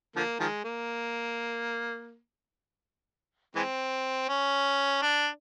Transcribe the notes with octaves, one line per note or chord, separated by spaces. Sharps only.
D3 F3 A#3
D#3 F3 G#3
A#3
E3 G#3 C4
C#4
D4